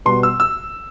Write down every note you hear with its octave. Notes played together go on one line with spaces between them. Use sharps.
B2 G3 B3 C6
E6
E6